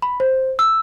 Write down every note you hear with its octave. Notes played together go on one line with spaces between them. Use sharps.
B5
C5
E6